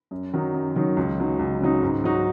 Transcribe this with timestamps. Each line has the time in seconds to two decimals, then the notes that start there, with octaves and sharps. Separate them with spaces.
0.11 F#2
0.33 D#3 F#3 D#4
0.54 F#2
0.76 D#3 F#3 D#4
0.97 C#2
1.19 C#3 F#3 D#4
1.39 C#2
1.61 C#3 F#3 D#4
1.82 G#2
2.04 F#3 D#4 F#4